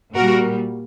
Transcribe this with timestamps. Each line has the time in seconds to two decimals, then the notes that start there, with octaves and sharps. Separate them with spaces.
0.14 A#2 G3 F#4 A#4